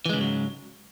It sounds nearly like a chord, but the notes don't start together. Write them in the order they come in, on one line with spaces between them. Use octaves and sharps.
E3 G#3 C#3 G#2 F#3